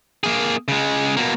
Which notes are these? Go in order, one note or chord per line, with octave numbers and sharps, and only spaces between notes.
A#3 G#4
C#3 G#3
B2 A#3